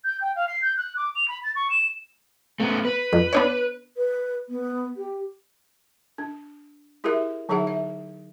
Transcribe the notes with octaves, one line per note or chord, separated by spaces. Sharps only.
G6
G5
F5
C7
G6
F#6
D6
F7
B5
A6
C#6
E7
A3 B3
B4
F2
B3 D4 C#5
B4
B3
G4
D4
E4 G4 G#4 A#4 E5
D3 F#3 D#4 G#4 E5 F#5
E5